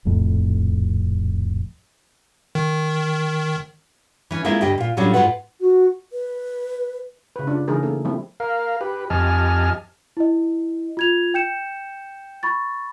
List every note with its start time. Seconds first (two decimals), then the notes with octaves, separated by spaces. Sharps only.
0.05 D#1 C2 F2 A2
2.55 D#3
4.31 E3 C#4
4.45 G#3 A#3 C4 E4 F4 E5
4.61 D2 G2 G4 D#5
4.78 A#2 F4
4.97 A2 F#3 G3 C#4 D4 F4
5.14 G#2 F#3 F4 F#4 B4 F#5
5.61 F#4
6.13 B4
7.36 C#3 B4
7.47 D4 F4
7.68 C#3 E3 A3 D#4 G#4 A#4
7.83 A#3 A4
8.05 F3 G3 A3 A#3 C4 E4
8.40 A#4 F5
8.81 G4 B4
9.10 F2 G4 D#5 G#5 A5 F6
10.17 E4 D#5
10.97 F4 G#6 F7
11.34 G5 G6 C#7 E7
12.43 B5 C#6 A6